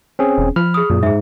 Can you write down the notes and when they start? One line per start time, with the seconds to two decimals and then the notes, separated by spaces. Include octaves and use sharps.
0.19 C4 C#4 G#4
0.38 E1
0.56 F3 B5 F6
0.74 G#4 D#6
0.90 F#2 A#2
1.03 G#2 G#4 E5